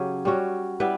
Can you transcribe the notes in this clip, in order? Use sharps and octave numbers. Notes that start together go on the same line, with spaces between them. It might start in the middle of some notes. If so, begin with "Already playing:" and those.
Already playing: C#3 F#3 C#4 G4
G3 C#4 F#4
G3 B3 E4 B4